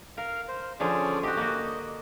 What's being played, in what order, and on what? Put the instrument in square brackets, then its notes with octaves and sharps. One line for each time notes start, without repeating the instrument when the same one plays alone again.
[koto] A#4 [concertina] F5
[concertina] C5
[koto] D3 F3 [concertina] C#4 G#4 D5
[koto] F#4 G4 [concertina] D#5
[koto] A#3 F#4 [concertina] D#5